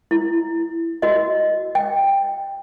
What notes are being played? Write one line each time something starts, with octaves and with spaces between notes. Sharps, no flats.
E4
F#4 D#5
G5